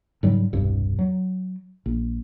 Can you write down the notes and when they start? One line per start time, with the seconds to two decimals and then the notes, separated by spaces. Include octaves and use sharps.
0.23 G#2 C#3 F#3 G3
0.53 E1 C2 G2
0.99 F#3
1.86 A#1